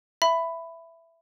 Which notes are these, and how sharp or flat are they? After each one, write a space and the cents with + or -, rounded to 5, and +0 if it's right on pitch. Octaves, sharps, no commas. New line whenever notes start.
E5 +10 B5 +10